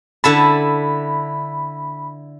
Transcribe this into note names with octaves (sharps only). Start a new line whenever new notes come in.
D3 E4 A5 B5